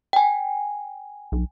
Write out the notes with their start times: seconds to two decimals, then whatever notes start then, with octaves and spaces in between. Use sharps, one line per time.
0.13 G5 G#5
1.32 B1